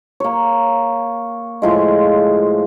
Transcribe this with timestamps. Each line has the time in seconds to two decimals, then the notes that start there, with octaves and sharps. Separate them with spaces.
0.20 A#3 C#5
1.62 A2 F3 G#3